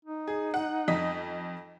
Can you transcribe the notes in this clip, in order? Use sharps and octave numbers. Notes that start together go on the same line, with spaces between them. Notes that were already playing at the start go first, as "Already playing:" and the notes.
D#4
G#4
F#5
F2 D#5 B6